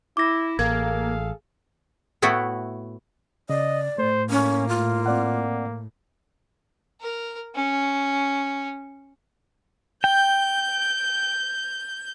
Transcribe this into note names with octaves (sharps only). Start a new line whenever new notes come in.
E4 D6 A#6
A1 A#3 G#4 A4 F5 G#6
A2 A3 B3 E4 F#4
C#3 D5 D#5
A2 A3 C5
A#3 C#4
F4
C4 D5 F#5
A#4
C#4
G5 G6